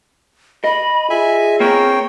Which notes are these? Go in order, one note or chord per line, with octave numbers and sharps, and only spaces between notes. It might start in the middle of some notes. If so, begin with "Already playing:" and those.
D#5 B5
F4 G#4 E5 G#5
A#3 C4 A#4 C#5 G5